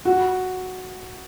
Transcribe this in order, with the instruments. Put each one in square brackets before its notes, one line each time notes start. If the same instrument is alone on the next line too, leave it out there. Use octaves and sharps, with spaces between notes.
[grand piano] F#4